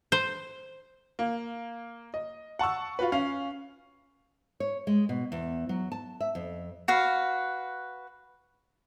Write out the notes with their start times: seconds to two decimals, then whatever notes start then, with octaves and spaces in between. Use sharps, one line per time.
0.12 C5
1.19 A#3
2.14 D#5
2.59 F#5 A5 C#6 E6
2.99 F4 F#4 B4
3.12 C#4 F5
4.60 C#5
4.87 G#3
5.09 B2
5.32 E2
5.69 F#3
5.92 A5
6.21 E5
6.35 F2
6.88 F#4 B4 F5